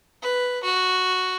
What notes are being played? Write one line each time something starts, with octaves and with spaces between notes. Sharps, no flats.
B4
F#4